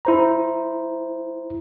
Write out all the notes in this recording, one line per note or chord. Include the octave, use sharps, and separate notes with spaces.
E4 C5 A#5